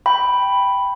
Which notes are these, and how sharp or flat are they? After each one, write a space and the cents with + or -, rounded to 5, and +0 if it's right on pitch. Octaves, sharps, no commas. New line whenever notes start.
G5 +0 B5 +0